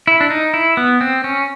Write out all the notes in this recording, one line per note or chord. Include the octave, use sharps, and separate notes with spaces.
E4
D4
D#4
E4
B3
C4
C#4